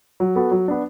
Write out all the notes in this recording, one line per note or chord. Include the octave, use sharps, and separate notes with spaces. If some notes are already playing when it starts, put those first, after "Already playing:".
F#3
B3 F#4 A4
F#3
B3 D4